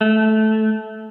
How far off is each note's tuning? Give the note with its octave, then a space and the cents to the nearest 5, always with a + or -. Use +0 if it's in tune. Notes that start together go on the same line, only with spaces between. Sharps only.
A3 -10